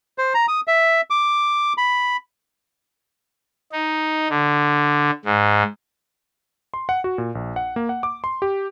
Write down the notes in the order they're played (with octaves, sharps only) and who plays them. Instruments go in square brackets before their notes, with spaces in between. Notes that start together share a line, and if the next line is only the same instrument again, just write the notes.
[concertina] C5
A#5
D#6
E5
D6
B5
[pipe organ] D#4
D3
G#2
[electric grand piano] C6
F#5
F#4
A#2
A#1
F#5
A#3
F#5
D6
C6
G4